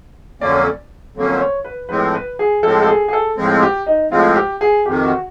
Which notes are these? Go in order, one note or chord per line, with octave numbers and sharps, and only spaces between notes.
F2 D3 F#3 A#3 C#4 D5
F2 D3 F#3 A#3 C#4
C5
C#5
B4
A2 F3 G#3 C4 B4
B4
G#4
A2 F3 G#3 C4 A4
A4
G#4
G#4
A4
A2 F3 G#3 C4
G4
D#4
A2 F3 G#3 C4 F4
G4
G#4
F2 C3 D#3 G4
F#4